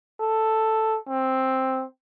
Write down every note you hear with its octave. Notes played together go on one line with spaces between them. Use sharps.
A4
C4